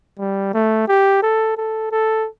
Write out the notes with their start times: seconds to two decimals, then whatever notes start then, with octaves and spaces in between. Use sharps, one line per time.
0.19 G3
0.54 A3
0.88 G4
1.22 A4
1.57 A4
1.91 A4